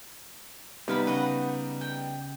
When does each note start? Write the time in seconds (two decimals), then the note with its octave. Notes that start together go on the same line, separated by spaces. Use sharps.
0.88 C3 G3 B3 D#4 E4 F5 B5
1.07 C#3 B4 D#5 F#5
1.81 G5